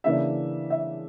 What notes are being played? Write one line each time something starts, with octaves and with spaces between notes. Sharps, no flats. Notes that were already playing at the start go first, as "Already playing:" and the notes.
C#3 E3 A#3 D4 E5
E5